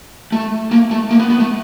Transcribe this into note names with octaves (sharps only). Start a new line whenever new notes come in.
A3
A#3
A3
A#3
B3
B3
A3